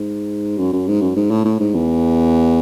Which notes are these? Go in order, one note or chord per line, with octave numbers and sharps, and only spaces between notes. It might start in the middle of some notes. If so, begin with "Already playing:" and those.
Already playing: G#2
F#2
F#2
G#2
F#2
G#2
A2
A2
G#2
E2